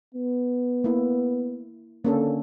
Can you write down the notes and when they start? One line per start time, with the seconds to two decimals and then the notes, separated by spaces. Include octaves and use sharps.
0.14 B3
0.84 A#3 E4
2.05 D3 A#3 C#4 A4